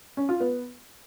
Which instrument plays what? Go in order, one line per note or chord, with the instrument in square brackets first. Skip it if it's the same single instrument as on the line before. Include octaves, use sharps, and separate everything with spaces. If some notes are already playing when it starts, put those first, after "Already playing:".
[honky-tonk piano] C#4
F4
B3